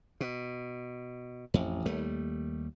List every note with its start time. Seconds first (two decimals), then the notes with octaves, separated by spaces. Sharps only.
0.21 B2
1.54 A1 F2
1.86 D#2 G3 A3